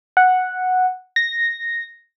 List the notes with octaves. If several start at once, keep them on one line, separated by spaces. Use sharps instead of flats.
F#5
A#6